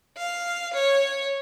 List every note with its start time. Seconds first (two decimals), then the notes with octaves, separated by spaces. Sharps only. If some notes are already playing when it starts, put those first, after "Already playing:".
0.17 F5
0.73 C#5